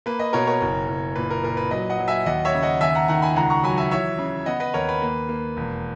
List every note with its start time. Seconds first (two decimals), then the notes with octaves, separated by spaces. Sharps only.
0.06 A#3 B4
0.19 B4 D#5
0.33 B2 A#4 C#5
0.47 A#4 C#5
0.61 F#1
0.88 F#1
1.16 A#2 B4
1.30 A#4
1.43 A#2 A#4
1.57 B4
1.71 F#3 B4 D#5
1.90 D#5 F#5
1.99 F#3
2.08 E5 G#5
2.26 D#2 D#5 F#5
2.45 C#5 E5
2.54 C#3
2.62 D#5 F#5
2.81 D#2 E5 G#5
2.95 F#5 A#5
3.08 D#3 F#5 A#5
3.22 G#5 B5
3.36 C#2 F#5 A#5
3.50 A#5 C#6
3.63 F#3 G#5 B5
3.77 E5 G#5
3.91 E3 C#5 E5
4.19 C#3
4.46 B3 D#5 F#5
4.60 B4 D#5
4.74 D#2 A#4 C#5
4.89 B4
5.02 A#3
5.29 A#3
5.57 E1